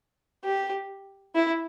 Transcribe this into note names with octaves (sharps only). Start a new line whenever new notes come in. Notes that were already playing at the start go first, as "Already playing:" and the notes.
G4
E4